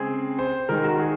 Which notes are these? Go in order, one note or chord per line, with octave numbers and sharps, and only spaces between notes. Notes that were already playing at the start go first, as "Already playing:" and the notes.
Already playing: C#3 G#3 C4 G#4
C5
D#3 G#3 D#4 A#4
F#4
G#4